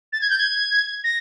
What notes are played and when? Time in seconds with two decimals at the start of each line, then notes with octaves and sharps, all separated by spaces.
0.13 A6
0.21 G#6
0.30 G6
0.39 G#6
1.04 A#6